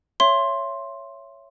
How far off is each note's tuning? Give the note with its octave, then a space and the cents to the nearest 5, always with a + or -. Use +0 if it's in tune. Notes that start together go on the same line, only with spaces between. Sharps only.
C#5 +0 E5 +25 C6 +10